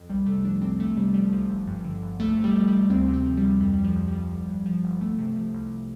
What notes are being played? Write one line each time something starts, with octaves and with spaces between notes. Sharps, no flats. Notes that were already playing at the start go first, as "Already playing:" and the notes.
Already playing: F2
C2 G3
C3 A3
F3 D4
C2 C4
C2 A3
C3 G3
F3 G3
C2 F3
G1
G2
D3
G1
C2 A3
C3
G3
F3
C2 G3
D2 C4
C3
C4
F3
G3
D2
F2 G3
F3 G3
F3
F2
G3
F3
G1 G3
G2
F3
G1
C2 A3
C3
F3
C2